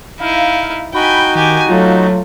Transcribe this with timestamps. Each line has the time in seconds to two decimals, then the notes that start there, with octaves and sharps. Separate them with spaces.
0.20 D#4 E4 F5
0.94 D#4 F#4 G5 G#5 B5
1.35 D#3 G4 G#5
1.69 F#3 A3 F4